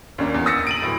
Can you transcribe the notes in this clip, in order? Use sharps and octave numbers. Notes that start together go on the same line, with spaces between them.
D#2 A#3 C#4 D4
E2
D#6 E6 A6 A#6 C#7
D7 D#7 F#7
D1 A2